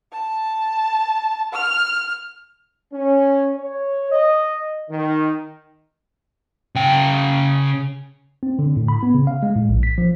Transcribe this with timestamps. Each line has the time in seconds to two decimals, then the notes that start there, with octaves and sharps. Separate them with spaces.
0.12 A5
1.53 F6
2.94 C#4
3.57 C#5
4.12 D#5
4.91 D#3
6.75 C#3 G5
8.43 C4
8.59 D3
8.77 A2
8.88 B5
9.03 B3
9.14 C#3
9.27 F5
9.43 G#3
9.56 A2
9.69 A#1
9.83 B6
9.98 F3